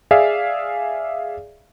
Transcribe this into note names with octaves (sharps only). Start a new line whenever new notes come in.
G#4 D5 E5 F5